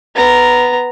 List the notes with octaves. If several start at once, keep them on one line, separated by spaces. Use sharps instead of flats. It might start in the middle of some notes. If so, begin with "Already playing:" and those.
B3 A#5